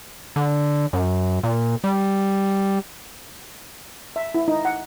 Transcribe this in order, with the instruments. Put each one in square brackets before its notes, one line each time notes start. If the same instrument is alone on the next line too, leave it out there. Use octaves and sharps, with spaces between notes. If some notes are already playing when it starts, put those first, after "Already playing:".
[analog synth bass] D3
F#2
A#2
G3
[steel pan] E5
E4
D#4
F#5